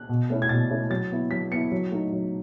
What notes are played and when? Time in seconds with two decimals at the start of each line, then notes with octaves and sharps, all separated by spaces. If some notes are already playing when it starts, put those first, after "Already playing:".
Already playing: F#6
0.09 B2
0.30 A3 C#4 E4
0.42 G#6
0.49 B2 A6
0.70 A3 C#4 E4
0.90 F#3 A6
1.11 B3 E4
1.31 F#3 B6
1.51 B3 E4 C#7
1.72 F#3
1.92 A3 D#4
2.12 F#3